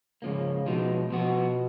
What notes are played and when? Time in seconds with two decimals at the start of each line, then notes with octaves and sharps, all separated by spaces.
0.22 G#2 C#3 F3 A#3
0.66 B2 F3 G#3 D#4
1.10 B2 F3 B3 F#4